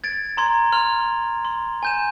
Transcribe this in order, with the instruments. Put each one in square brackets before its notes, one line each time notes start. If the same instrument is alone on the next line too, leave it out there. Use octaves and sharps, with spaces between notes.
[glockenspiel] G#6 A6 D7
A#5 C6 G#6
C6 F6 F7
C6
G#5 G6 E7